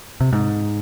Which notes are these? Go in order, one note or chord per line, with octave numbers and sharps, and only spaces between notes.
C3
G#2